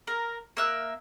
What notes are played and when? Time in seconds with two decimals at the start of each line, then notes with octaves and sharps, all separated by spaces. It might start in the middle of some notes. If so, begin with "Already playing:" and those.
0.07 A#4
0.57 A#3 E5 F#6